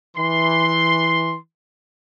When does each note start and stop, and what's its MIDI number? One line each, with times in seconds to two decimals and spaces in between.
0.17 1.36 52
0.17 1.36 84